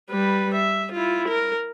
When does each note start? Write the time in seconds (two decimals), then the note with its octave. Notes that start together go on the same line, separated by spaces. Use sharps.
0.10 G3 B4
0.55 E5
0.93 E4 F4
1.29 A#4